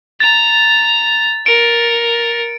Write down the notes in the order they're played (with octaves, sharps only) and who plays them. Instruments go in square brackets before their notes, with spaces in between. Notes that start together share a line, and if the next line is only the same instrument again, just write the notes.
[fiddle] A#5 [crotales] A6
[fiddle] A#4 [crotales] C#7 D7